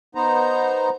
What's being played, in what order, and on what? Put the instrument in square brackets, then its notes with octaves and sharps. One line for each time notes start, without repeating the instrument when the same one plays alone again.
[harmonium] B3 D#4 C5 A#5